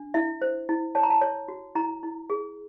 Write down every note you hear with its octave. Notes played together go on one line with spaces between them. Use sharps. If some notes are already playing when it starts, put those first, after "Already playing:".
Already playing: D4
E4 E5
C5
E4
C#5 A5
A#5
A5
C#5
F#4
E4 A#5
E4
G#4